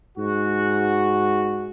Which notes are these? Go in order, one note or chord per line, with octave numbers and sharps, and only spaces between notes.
G#2 F#4